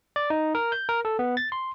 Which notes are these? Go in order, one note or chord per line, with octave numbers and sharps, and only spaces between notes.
D5
D#4
A#4
G6
A#4
A4
B3
A6
C6